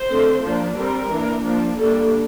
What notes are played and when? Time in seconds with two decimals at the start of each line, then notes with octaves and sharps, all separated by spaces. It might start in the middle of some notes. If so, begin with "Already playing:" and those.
Already playing: C5
0.09 D3 A3 C4
0.43 F3 A#3 D4
0.77 G3 C4 A#4
1.11 E3 A#3 D4
1.45 F3 A#3 D4
1.78 D3 G3 A#3 D4 A4